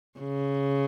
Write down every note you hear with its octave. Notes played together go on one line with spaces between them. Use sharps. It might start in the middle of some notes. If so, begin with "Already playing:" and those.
C#3